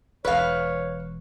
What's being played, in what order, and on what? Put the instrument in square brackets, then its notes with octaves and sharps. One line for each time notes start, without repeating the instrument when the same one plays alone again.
[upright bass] E1 E3 [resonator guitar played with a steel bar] B4 F5 [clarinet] C#5